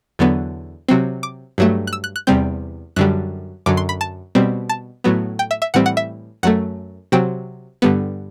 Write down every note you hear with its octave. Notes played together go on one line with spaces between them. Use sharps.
E2 D3 F#3 B3
C3 F#3 C4
D6
G2 F#3 A3
F#6
E6
F#6
F#6
E2 C3 G3 C4 G6
F#2 D3 G3 F#6
F#2 D3 F#3 D6
C6
B5
A5
B2 G3 C4
A5
A2 F#3 B3
G5
E5
E5
A2 E3 G3 C4 F#5
F#5
E5
F#2 F#3 A3 F#5
C3 F#3 C4 G5
G2 D3 G3 B3